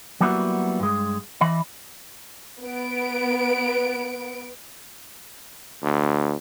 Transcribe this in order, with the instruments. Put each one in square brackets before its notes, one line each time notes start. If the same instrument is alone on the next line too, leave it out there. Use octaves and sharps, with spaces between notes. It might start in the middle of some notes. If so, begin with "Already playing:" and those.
[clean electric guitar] F#3 G3 A#3 B3 E4 F#4
G2 G#3
E3 D#5 B5
[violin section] B3 D7
[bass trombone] D2